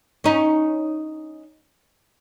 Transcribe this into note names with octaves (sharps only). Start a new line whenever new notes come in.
C#4 D#4